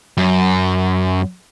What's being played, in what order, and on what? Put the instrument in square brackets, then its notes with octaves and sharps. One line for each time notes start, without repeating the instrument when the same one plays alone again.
[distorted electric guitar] F#2